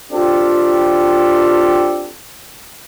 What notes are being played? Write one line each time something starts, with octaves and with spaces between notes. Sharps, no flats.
C4 D4 F4 G4 A4